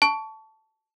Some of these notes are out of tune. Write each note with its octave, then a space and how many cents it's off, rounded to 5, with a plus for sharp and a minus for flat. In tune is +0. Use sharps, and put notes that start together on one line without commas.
A5 +0 C#6 +25